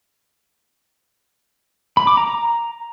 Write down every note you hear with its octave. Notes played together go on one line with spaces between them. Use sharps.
B5
D6
A#5
A#5